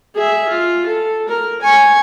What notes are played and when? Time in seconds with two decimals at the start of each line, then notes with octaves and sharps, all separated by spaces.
0.15 G#4 E5
0.48 F4
0.86 A4
1.29 A#4
1.62 G#5 C#6